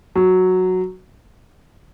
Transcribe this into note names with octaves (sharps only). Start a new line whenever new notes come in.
F#3